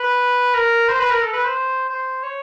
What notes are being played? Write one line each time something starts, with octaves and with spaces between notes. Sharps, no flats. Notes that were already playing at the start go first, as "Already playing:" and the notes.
Already playing: B4
A#4
C5
B4
A#4
A4
B4
C5
C5
C#5